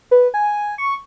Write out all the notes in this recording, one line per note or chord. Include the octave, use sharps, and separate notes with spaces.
B4
G#5
C#6